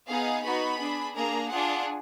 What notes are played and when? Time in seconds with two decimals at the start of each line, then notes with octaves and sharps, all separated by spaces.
0.08 B3 D#4 G#4 F5
0.44 B3 D#4 F#4 B5
0.79 D4 G#4
1.15 A#3 D4 G#4 A#5
1.50 D4 F4 G#4 F#5